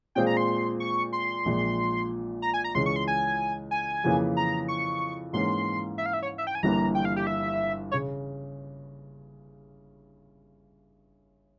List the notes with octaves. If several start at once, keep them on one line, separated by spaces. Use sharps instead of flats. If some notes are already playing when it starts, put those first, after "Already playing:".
A#2 G#3 C4 F4 G#4 G5
A#5
C6
C#6
C6
A#1 A#2 G#3
A#5
G#5
A#5
C#2 C#3 E3 C6
C#6
C6
G#5
G#5
F2 C#3 E3 A#3 F4
A#5
C#6
G#2 E3 A#3 C#4 C6
E5
F5
E5
C#5
E5
G5
G#5
G1 G2 E3 A#3 A#5
G5
F5
G4
E5
C#3 C#5